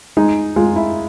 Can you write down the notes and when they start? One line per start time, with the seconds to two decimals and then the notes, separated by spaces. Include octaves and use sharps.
0.17 G#3 D#4
0.56 G#3 F4
0.76 E4